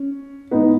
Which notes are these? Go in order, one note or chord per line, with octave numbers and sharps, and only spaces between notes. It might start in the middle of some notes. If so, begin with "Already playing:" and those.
Already playing: C#4
G#2 E3 B3 D#4